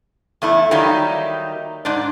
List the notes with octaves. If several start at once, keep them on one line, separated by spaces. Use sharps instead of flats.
E2 A3 E4
D#3 F#3 G3 A#3 D#4 E4
G#2 D4